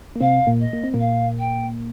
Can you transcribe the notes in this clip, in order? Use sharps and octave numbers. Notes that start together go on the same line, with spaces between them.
A#3
C3 C4 F5
A#2 A#3
D#5
A#3
C4
A#2 A#3
F5
G5